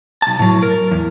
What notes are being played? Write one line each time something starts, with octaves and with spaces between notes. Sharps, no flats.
B1 A5
A2 F#3
A#4
E2